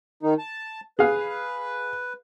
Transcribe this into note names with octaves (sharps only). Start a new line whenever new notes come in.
D#3 D#4
A5
G#4 B4 F5